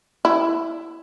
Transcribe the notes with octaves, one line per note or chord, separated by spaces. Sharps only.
E4